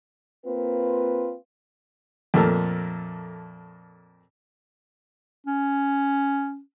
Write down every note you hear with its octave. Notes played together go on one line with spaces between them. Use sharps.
A#3 C4 F4 B4
F2 A#2 A3 A4 A#4 A5
C#4